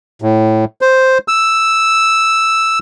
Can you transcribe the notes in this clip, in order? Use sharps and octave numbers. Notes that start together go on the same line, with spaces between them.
A2
C5
E6